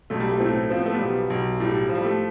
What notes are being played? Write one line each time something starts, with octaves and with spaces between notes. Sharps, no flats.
B1 A3
G3
A3
A2 A3 C4
F3 C4
B3
A3
G3 B3
B1
B1
A2 G3
F3
G3
A3